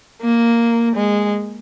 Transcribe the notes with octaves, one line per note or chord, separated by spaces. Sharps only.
A#3
G#3